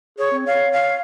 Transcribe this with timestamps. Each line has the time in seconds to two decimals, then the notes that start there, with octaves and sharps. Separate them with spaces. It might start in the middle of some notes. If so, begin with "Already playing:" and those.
0.19 G#4 C#5
0.31 C4
0.47 C#5 F5
0.72 F5